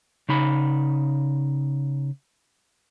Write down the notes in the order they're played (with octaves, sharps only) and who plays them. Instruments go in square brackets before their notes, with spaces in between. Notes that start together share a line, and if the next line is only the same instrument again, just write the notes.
[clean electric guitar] C#3 D#4 B5